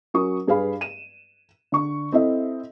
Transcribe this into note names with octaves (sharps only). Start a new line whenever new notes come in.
F#3 C#4 A#4 C#6 D#6
G2 G#4 B4 F5 B5
D#7 E7
D3 C#6
C4 E4 A4 D#5 E5